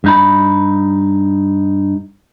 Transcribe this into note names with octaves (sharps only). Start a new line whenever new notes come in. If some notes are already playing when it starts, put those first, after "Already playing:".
G2 D#4 B5